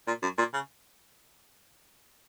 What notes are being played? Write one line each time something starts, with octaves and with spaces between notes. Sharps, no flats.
A#2
F#2
A#2
C#3